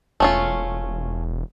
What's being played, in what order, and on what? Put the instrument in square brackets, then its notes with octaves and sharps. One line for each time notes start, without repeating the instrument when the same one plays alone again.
[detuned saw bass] E1 [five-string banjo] A3 C#4 F4